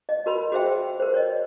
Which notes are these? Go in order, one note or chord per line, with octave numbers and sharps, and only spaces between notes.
D#5
F#4 A#4 B5
F#4 G#4 C5 E5 G5
A#4 C5
C#5 D#5